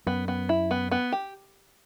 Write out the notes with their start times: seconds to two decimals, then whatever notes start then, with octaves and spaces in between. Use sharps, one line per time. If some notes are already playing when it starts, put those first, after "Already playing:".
0.06 F#2 B3
0.28 B3
0.49 E4
0.71 B3
0.91 B3
1.12 G4